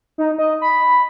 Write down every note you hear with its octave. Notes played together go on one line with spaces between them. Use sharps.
D#4
D#5
B5